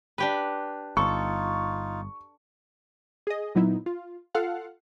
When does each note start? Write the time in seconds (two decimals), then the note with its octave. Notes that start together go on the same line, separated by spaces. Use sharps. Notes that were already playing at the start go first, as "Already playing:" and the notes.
0.18 D4 G4 B4
0.97 G1 D#4 F4 A4 C#6
3.27 G#4 D#5
3.55 A#2 F#3 B3 D#4 E4
3.86 F4
4.35 F4 A4 F5 F#5